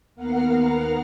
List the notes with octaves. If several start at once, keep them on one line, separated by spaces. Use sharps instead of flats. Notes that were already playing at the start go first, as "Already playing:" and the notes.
D#2 B3 A#4 F5 F#5 F6